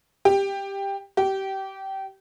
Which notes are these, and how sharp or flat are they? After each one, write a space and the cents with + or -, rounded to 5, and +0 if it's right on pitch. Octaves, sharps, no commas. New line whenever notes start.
G4 +10
G4 -25